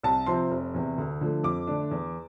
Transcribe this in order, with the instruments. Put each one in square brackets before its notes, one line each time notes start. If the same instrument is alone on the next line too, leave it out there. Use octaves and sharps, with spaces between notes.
[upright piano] C2 A5
C3 F3 C4 C6
F1
E2 C3
D2
D3 F3 A3
F2 D6
D3 A3 D4
E2